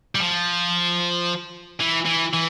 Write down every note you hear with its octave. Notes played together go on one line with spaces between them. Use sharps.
G3
F3
E3
E3
E3